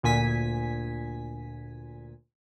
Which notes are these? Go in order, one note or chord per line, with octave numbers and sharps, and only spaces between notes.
D2 A#2 G#5 B6